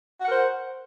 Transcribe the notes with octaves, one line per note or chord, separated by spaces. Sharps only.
F#4 A#4 C5 F#5